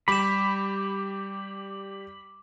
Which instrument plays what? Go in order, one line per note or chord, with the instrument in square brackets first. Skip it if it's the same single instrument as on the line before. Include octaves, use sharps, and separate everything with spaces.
[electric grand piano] G3 G4 [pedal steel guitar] B5 [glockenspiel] D6 E7